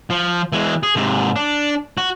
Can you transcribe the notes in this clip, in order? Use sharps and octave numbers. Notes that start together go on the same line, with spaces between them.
F3
E3 G#3
G#4
G#2 C3
D4
F#4